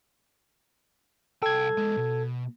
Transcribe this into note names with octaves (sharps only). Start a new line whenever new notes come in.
C2 A4 G5 G#6
G#3 B3
B2